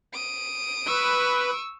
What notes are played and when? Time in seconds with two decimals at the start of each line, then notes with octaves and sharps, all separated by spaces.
0.14 D#6 D7
0.87 B4 C#6 E6